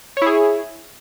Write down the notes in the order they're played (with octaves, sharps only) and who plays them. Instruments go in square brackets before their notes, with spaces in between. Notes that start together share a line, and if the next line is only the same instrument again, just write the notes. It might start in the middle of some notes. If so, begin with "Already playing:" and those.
[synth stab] C#5
E4
G#4